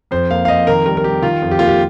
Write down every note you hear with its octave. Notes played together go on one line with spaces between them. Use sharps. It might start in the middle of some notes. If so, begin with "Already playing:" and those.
F2 C5
A#3 F5
F5
F2 D#5
D#3 A#4
G3 A#4
A#4
G3 G4
D#3 F4
F2
G4
A#3 F4
G4